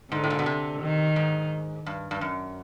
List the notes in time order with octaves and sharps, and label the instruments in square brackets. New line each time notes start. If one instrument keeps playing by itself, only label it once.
[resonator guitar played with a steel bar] G#2 [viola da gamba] D3
[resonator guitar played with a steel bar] A2
A#2
B2
C3
[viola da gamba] D#3
[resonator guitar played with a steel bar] G#2
G2
G2
F#2